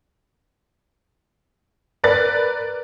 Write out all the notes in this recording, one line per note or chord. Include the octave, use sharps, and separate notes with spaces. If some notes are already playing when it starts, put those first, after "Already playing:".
A#4 B4 D5 F#6 A6